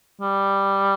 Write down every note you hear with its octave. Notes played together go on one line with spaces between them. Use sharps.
G3